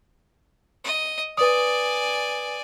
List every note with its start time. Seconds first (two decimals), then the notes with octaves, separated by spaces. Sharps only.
0.84 D#5
1.37 B4 D5 G#5 D#6